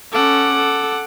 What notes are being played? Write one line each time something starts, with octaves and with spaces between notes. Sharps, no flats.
C#4 A4 F#5 D6
A4